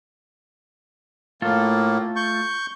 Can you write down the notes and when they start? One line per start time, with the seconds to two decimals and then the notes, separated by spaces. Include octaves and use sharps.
1.42 A2 A3 A#3 F4 A4
2.16 C#6 G6